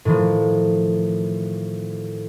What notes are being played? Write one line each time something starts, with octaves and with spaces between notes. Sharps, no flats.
A2 D#3 F3